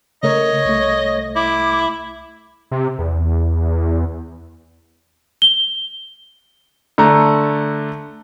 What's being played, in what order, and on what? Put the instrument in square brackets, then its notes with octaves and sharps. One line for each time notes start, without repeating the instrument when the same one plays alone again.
[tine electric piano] C#3 A3 A#4 [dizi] C#5 [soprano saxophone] D#5
[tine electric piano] C2 A3
[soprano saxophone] E4 [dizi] D6
[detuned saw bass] C3
E2
[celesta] G7
[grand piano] D3 A3 A#5